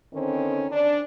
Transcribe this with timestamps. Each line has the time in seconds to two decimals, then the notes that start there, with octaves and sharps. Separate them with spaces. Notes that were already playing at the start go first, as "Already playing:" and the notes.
0.13 D3 D#3 C4 C#4
0.72 D4